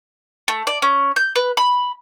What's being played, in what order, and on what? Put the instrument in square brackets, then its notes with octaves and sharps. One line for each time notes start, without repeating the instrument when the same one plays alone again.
[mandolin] A3
D5
C#4
G6
B4
B5